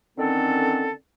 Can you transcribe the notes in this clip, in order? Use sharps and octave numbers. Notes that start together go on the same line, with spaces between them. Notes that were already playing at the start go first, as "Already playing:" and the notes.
D3 D#3 C4 C#4 A4